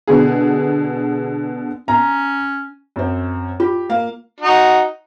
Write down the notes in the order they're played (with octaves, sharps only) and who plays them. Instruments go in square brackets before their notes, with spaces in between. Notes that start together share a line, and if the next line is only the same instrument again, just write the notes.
[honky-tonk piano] B2 D3 G#4
[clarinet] C#4 [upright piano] A#5
[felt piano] F#2 C4
[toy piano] F4 [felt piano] G4
[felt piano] A#3 F5
[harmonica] D#4 F#4